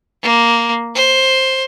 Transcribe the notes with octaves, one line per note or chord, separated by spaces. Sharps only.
A#3
C5